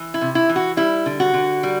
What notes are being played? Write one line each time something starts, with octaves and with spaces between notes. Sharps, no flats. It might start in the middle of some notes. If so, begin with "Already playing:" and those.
Already playing: E3
E4
C3
E4
E3
F#4
G3 E4
D3
F#4
D3
G3